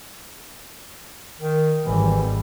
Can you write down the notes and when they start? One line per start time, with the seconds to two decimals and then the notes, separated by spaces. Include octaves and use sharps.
1.41 D#3
1.86 G#1 E3 G3